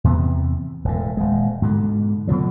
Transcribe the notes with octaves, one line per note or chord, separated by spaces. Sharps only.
E2 C3 E3 B3
E1 A2
D#1 G#3
G#2 B2 D3
B2 D3 F3 F#3